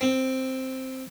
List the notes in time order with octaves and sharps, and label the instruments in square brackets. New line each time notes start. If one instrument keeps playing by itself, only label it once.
[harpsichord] C4